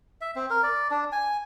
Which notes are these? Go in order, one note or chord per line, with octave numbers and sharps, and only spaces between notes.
E5
C4
A#4
D5
D4
G#5